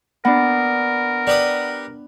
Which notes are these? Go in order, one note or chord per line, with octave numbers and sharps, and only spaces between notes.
B3 D4 A#4 F#5
G3 B4 D#6